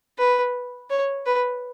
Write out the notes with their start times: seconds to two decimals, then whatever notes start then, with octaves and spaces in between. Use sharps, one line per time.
0.18 B4
0.90 C#5
1.26 B4